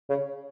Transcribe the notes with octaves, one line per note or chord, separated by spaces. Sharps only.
C#3